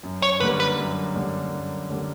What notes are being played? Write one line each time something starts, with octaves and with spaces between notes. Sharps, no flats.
F#2
C#5
D3 G3 A#3 B4
B4
F#2
D3 G3 A#3
F#2
D3 G3 A#3